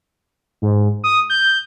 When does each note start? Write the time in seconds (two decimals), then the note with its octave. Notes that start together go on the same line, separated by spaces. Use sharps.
0.62 G#2
1.04 D#6
1.30 G6